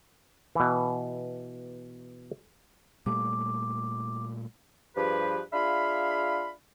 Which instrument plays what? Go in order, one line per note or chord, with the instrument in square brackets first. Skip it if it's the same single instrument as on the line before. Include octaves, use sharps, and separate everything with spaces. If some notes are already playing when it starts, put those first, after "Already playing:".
[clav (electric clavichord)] B2 E3
[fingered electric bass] A#2 G3 A3 [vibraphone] D6
[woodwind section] G2 F3 G4 G#4 B4
D4 F4 G#4 E5 F5 B5